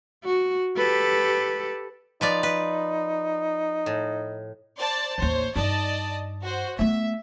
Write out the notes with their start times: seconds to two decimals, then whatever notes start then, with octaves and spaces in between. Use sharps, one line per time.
0.24 F#4
0.76 G4 A4 B4
2.21 F3 D#4 B4 D5
2.43 B4
3.86 A2
4.78 C5 D5 A5
5.18 A1 D#2 C5 C#5
5.56 G2 D#4 D5 D#5 A5
6.43 F#4 C5
6.79 A3 B3 E5